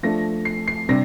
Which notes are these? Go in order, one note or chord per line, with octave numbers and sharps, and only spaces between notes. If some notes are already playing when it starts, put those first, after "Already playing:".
F3 A3 D4 A#6
C7
C7
C3 G3 D4 A#6